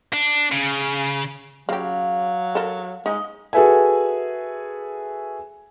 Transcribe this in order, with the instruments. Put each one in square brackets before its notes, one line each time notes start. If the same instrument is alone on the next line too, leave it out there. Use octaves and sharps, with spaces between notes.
[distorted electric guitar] D4
C#3
[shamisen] C#3 G4 [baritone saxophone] F#3 [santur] F5
[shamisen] A4 A#4
[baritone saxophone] G#3 [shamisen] D#4 [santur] D#5
[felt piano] F#4 G#4 A4 B4 E5 G#5